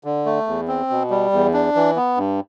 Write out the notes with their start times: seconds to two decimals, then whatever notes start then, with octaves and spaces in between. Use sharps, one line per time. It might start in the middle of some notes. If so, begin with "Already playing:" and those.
0.04 D3
0.26 A3
0.47 E2
0.68 C4
0.90 B2
1.10 G3
1.33 E2
1.54 D4
1.75 E3
1.96 B3
2.18 G2